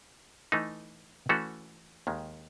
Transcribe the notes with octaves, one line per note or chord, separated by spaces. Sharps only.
E3 A3 D#4
E3 A3 C#4 F#4 A4
D#2 D#3 G#3